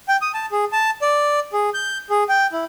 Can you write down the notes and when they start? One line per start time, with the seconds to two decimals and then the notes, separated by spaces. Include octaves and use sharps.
0.08 G5
0.22 D#6
0.34 A5
0.52 G#4
0.72 A5
1.02 D5
1.53 G#4
1.74 G6
2.10 G#4
2.29 G5
2.52 E4